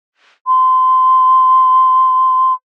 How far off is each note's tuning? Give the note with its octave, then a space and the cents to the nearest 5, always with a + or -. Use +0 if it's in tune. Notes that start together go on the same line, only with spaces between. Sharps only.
C6 -20